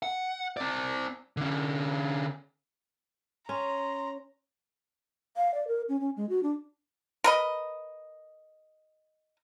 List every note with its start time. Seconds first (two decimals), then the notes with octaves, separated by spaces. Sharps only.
0.03 F#5
0.57 C4 D5
1.37 D3 C#4
3.49 C#4 A#5 C6
5.36 F5
5.54 D5
5.68 A#4
5.89 C#4
6.01 C#4
6.17 G#3
6.29 F#4
6.43 D4
7.24 A#4 B4 D#5